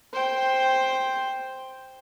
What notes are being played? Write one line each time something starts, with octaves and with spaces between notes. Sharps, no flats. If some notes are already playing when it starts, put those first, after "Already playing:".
C5 G5